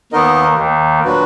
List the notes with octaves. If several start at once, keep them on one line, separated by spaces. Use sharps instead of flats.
D#2 D#3 B3 D#4 A#4 D#5
D#2 D#3
A#2 F#3 D4 F#4 B4